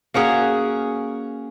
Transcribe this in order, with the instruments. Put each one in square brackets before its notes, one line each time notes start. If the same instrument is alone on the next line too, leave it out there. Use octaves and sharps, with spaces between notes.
[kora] A#3 C#4 F#4 G#4